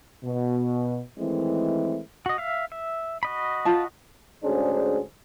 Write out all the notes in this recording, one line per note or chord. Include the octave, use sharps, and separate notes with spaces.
B2
D#3 E3 G#3 A3 C4 E4
F#4 D#5
E5 F5
E5
F#4 D#5 B5
F4 A5
D2 G#2 C#4 D4 G#4 C5